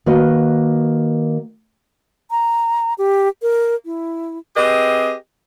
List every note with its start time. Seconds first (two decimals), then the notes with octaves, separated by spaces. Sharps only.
0.06 D#3 A#3 F#4 B4 D#5
2.31 A#5
2.98 G4
3.42 A#4
3.85 E4
4.56 C4 G4 G#4 B4 D#5